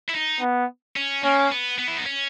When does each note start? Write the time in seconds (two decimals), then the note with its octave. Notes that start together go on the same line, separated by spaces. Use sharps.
0.10 E4
0.14 D#4
0.41 B3
0.96 C#4
1.23 A#3 C#4
1.52 B3
1.79 B3
1.88 E4
1.97 D#4
2.06 C#4